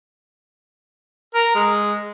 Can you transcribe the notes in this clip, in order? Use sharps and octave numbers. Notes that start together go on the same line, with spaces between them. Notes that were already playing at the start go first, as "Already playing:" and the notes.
A#4
G#3